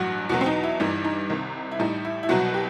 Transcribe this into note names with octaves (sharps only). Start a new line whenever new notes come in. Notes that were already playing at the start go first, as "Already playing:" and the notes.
Already playing: A1 G2 F#3 F#4
E2 B2 F#3 F#4
C4
D#4
E4
G1 G2 E3 G3 D#4
D#4
C2 C3 D#3
E4
A1 A2 G3 D#4
E4
E4
C2 B2 F#3 F#4
G4